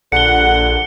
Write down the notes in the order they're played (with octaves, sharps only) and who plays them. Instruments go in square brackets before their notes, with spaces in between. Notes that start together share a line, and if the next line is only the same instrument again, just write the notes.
[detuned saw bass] A#1 [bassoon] D3 [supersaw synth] F#5 [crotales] C#7 G7